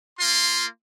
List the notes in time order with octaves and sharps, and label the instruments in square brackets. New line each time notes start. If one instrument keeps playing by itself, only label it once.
[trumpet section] A#3 F4 C6